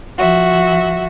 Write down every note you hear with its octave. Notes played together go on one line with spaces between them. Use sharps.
F3 F#4 E5